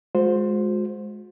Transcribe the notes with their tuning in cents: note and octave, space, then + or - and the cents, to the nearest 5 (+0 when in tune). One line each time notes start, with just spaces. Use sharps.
G#3 +15 F#4 -45 C5 +0